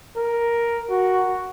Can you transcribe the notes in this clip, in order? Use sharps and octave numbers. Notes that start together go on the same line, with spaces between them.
A#4
F#4